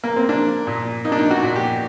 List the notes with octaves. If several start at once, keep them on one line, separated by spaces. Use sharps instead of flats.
A#3
C4
A#3 D4
A#2
A#3 D#4
D4
D#4
F#4
A#2
G4